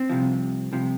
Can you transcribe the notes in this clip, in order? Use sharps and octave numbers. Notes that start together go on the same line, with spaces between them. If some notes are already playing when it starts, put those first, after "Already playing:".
Already playing: C4
C2 C3 F3
C2 C3 F3